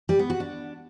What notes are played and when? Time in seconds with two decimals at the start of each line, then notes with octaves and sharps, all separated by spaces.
0.09 G3
0.19 B3
0.30 F#4
0.40 D4